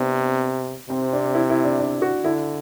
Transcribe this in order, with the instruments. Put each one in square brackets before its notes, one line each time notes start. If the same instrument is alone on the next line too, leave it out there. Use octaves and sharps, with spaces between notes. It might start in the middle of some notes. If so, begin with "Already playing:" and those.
Already playing: [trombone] C3 [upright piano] B3 C4 D4
[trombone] C3 [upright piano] C4
[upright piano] D4
E4
E4
D4
D4
F#4
[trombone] D3 [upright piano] E4